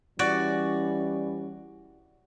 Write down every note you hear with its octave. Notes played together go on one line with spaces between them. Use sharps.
E3 G3 C#4 F#4 D5